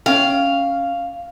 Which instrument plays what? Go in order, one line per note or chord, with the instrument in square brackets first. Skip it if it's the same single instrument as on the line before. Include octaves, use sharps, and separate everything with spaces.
[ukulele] C#4 G5 [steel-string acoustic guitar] F5